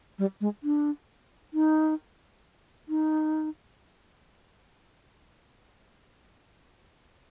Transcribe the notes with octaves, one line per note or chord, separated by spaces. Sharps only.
G3
G#3
D4
D#4
D#4